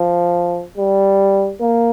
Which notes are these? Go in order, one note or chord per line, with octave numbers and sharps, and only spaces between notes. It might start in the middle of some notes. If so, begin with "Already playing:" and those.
Already playing: F3
G3
A#3